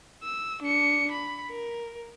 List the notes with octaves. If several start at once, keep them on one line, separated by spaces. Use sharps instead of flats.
E6
D4 C#7
B5
A#4